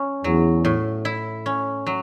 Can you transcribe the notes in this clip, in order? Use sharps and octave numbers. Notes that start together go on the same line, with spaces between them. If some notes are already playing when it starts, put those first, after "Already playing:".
Already playing: C#4
E2 F#3
A2
E4
C#4
F#3